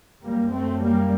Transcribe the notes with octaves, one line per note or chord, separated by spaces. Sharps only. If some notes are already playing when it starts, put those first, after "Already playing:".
F#2 G3 A#3
A3 C4
G3 A#3